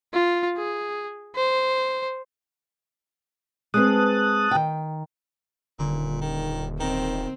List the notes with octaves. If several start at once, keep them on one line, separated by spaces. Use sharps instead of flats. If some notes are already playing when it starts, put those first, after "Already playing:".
F4
G#4
C5
G#3 C4 B4 A5 D#6 F#6
D#3 G5
D#1 A#2 D3
D#3
D#3 C4 A#5